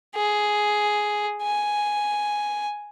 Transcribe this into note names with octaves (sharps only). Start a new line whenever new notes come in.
G#4
G#5